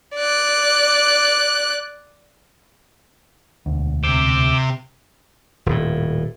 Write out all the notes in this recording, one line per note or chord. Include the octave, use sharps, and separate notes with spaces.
D5 F#6
E1 D2
C3 D6 E6 G6
D#1 A2